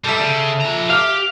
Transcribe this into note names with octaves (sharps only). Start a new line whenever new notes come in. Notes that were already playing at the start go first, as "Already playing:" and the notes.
G3 A4 E5
C#3
F3 A#5
G4 F5